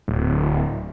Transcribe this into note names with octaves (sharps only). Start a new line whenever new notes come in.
D1